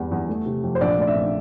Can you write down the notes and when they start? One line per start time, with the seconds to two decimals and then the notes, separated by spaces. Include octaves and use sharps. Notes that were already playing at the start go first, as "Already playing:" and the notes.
Already playing: E2 E3 G3
0.11 E2
0.29 A3
0.46 C3
0.63 F2
0.75 C5
0.81 A#1 D5
0.98 A3 D5
1.07 E5
1.15 A#1